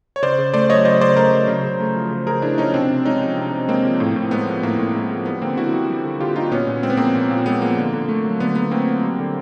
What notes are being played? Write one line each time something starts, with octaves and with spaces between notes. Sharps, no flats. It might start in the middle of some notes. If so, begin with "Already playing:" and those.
C#5
C#3 C5 D5
C#3
A3 C5 D5
F#3 C#5 D#5
C#3 C5 D5
C#3 C5 D5
A3 A#4 C5
F#3
C#3
C#3
A3
F3
C#3
C#3 G#4 A#4
A3 D4 E4
F3 C#4 D#4
C3 C4 D4
C3
G#3 C#4 D#4
F3
C3
C3
G#3 A#3 C4
F3
A2
A2
G#3 B3
F3
A2 A#3
A2
G#3
F3
G3 B3
D3 A#3 C4
D3 E4 F#4
G3
G3
D3
D3 F4 G4
G3 D#4 F4
A#2 B3 C#4
A#2
G#3 C4
B3
F3 A#3 C4
A#2
A#2
G#3 B3
F3 A#3
D3
D3
A3
F#3
D3 B3
D3 B3
A3 A#3 C4
F#3
G3
D3